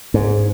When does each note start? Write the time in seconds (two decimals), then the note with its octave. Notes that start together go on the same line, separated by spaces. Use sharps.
0.14 G#2